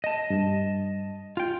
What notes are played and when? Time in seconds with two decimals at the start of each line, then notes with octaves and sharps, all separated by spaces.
0.04 D#5 A5
0.30 G2
1.37 F4 G5